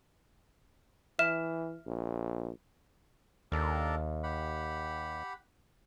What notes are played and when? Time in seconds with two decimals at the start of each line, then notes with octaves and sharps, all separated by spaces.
1.19 E3 E5 F6 E7
1.87 A#1
3.52 D#2 D4 A4 A#4
4.23 G4 F#5 B5